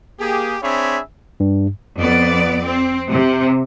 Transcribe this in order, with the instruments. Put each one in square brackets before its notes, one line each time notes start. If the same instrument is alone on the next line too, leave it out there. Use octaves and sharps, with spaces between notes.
[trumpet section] A#3 G4 G#4
C4 D4 G#4 C#5 E5 B5
[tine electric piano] G2
[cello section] F2 B3 D5
C4
C3